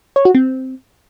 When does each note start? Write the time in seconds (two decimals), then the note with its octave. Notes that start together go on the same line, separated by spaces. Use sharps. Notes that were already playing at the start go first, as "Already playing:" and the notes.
0.16 C#5
0.25 F#4
0.35 C4